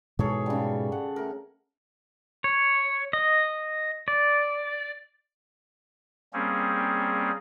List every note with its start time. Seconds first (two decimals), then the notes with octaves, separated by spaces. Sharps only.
0.19 G#2 B2 E3 G#4 A4 C#5
0.46 C#3 G3
0.92 F#5
1.16 A3 A#4
2.44 C#5
3.13 D#5
4.08 D5
6.33 G3 A#3 C4 C#4 G#4